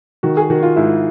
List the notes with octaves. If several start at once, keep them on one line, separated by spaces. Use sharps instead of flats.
D#3 F#4
G#4
D#3 F#4
F4
G#2 E4